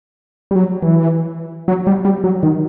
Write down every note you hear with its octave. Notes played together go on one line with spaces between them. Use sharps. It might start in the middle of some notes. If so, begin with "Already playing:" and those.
G3
F#3
E3
F#3
G3
G3
F#3
D#3